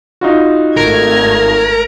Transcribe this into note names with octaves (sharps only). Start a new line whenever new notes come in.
D#4 F4 F#4
G#1 A3 A#4 G#6